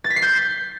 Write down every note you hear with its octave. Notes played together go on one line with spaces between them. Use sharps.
A6
B6
C7
G6